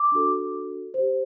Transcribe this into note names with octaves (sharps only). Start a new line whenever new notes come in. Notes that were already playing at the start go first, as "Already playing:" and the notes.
Already playing: D6
D4 F#4 A4
C5
G4